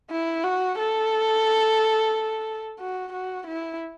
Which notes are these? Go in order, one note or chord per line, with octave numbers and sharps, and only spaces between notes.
E4
F#4
A4
F#4
F#4
E4